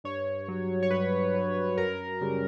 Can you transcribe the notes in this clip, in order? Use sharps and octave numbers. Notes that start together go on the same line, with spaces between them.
G2 C#5
F#3
C#5
G2 B4
F#3
F#2 A#4
C#3 G3